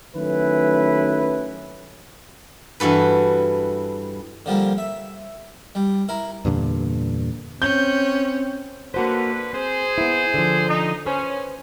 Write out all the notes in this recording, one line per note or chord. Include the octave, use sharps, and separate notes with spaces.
D#3 F#3 A3 C#4 E4 B4
G2 E3 F#4 A4 B4
D3 F3 G3 A#3
E5
G3
E4 A#4
E2 G2 A#2 D3
C4 C#4 G6
D3 A#3 F#4 B4 C5
C4 G#4 C5
B3 E4
D3 F3
D#4
C#4 B4 C5